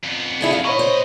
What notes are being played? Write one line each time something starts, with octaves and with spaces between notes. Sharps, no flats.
F2 B3
E4 G#4 A4
F5
A#2 C#5 D#5 B5 C#6
C5